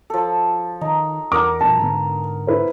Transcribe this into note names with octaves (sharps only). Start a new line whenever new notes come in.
F3 A4
D#3 D#4
E2 A#4 F#5 D6
G1 F2 B2 A5
G#2 D3 B3
E4 B4 C5